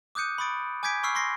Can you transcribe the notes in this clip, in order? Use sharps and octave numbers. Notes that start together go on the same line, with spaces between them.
D6 D#6 F#6 G6 C#7 D#7
B5 C#6 D#6 A6 D7
G#5 D6 G6 G#6 B6 D7
B5 C#6 E6 F6 C7
C6 C#6 A#6 C7